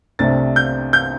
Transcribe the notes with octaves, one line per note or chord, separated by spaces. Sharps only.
C2 C3 A3 D4 A6
G6
G6